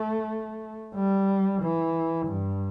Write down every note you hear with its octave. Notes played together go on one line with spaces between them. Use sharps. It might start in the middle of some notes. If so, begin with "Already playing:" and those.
Already playing: A3
G3
E3
G2